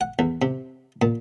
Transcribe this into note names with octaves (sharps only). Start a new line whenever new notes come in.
F#5
E2
C3
A#2